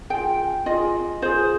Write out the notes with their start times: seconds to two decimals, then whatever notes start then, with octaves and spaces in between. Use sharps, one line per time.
0.10 F4 G#4 G5
0.66 F4 G#4 D#5
1.22 F4 G#4 C5